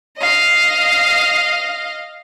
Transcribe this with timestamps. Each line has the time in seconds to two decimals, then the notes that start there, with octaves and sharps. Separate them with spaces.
0.18 D#5 F5